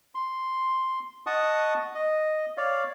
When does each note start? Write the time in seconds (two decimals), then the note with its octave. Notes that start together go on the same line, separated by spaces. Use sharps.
0.15 C6
1.26 D#5 F#5 A5 C#6 D#6
1.95 D#5
2.57 C#5 D5 F5